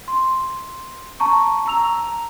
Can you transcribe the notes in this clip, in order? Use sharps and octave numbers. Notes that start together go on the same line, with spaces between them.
C6
A5 A#5 C#6
A#5 E6 F7